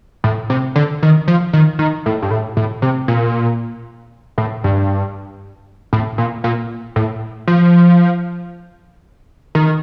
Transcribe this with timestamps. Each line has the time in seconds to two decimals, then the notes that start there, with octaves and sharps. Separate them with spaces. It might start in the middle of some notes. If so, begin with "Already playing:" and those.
0.24 A2
0.50 C3
0.76 D3
1.03 D#3
1.28 F3
1.53 D#3
1.79 D#3
2.06 A2
2.22 G2
2.31 A2
2.57 A2
2.82 C3
3.08 A#2
4.38 A2
4.64 G2
5.93 A2
6.18 A#2
6.44 A#2
6.96 A2
7.48 F3
9.55 D#3